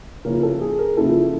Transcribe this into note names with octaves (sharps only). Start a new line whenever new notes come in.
C#3 F3 A#3 C#4 E4 A#4
A4
G#4
A#4
C#3 F3 A#3 C#4 E4 A4